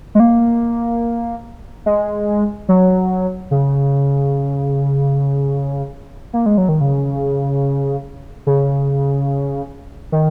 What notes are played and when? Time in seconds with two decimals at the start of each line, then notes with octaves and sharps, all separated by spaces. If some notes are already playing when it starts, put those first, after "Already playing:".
0.15 G#3
0.20 A#3
1.86 G#3
2.69 F#3
3.51 C#3
6.33 A#3
6.46 G#3
6.58 F#3
6.69 D#3
6.81 C#3
8.47 C#3
10.12 D#3